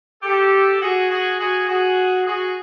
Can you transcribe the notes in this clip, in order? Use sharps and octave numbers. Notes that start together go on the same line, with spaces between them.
G4 A4
F#4 G#4
F#4 G#4
F#4 G#4
F#4 G#4
F#4 G#4